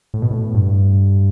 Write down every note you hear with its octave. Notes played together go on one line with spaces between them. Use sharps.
A2
B2
A2
G2